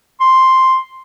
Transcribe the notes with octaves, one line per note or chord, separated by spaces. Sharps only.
C6